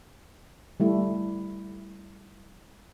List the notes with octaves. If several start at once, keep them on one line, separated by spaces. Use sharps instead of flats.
G3 A3 E4